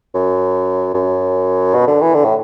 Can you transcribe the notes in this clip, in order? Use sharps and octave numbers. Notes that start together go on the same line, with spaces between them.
F#2
F#2
B2
D3
E3
D3
A2